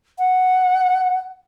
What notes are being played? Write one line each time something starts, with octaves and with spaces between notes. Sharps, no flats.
F#5